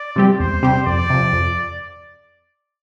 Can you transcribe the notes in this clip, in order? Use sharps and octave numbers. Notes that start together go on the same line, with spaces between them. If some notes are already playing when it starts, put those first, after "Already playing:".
Already playing: D5
C3 G3 C4 G4
E2 C5
C3 G3 C4 G4
F2 D5
C3 F3
F2